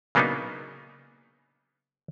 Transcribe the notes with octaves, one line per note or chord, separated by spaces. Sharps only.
C#3 F#3 A#3 B3 D4 D#4